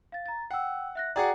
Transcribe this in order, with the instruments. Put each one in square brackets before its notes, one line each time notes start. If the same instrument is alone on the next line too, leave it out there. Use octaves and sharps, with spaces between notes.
[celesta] F5 A6
A#5 A6
[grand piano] F#5 [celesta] G5 E6
[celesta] E5 F#6 A#6
[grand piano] F#4 G#4 D5 [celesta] F#5 G5 A#5